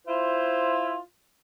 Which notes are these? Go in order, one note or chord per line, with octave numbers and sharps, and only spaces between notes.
E4 F4 C5